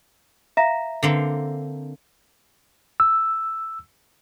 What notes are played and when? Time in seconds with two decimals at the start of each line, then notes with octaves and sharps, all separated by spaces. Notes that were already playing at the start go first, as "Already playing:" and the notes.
0.57 E5 F5 A#5
1.03 D3 A#3 C4
3.00 E6